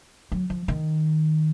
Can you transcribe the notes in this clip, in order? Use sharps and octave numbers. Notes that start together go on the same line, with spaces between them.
F#3
F3
D#3